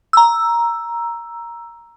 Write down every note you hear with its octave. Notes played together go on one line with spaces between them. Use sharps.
A#5 E6